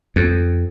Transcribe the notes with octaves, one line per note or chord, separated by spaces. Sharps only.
F2